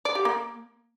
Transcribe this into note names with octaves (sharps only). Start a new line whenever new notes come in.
D5
G4
A#3